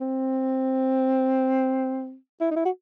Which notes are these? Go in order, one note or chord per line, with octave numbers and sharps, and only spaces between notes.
C4
E4
D#4
E4
F#4